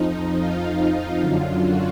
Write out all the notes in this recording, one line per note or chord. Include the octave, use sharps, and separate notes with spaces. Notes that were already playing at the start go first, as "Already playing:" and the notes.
Already playing: F2 F3 D#4
F4
F#2 D3 F#3
F#4